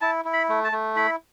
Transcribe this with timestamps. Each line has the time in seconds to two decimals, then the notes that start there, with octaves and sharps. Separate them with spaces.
0.01 E4 A5
0.25 E4
0.33 B5
0.49 A3
0.64 A5
0.72 A3
0.96 E4 B5